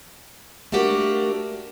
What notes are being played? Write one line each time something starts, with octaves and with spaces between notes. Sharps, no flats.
A3 A#3 D4 F#4 G4 A#4